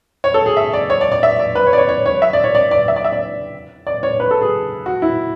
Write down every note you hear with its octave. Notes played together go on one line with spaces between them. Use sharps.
C#5
A4
G#4
E5
D5
C#5
D5
D5
E5
D5
B4
C#5
D5
C#5
C#5
C#5
E5
D5
C#5
D5
D5
E5
D5
E5
D5
D5
C#5
B4
A4
G#4
F#4
E4